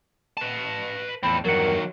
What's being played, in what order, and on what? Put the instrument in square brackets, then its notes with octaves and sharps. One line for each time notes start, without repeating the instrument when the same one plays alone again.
[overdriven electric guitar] B4 A5
[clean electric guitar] E2 A2 [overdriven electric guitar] C4 A4 [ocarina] B5
[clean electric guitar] E2 G2 F#5 [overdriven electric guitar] D#3 F#3 [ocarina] A#4